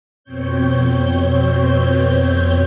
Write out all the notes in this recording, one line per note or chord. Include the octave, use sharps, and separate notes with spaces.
F2 B2 C4 C#5 G6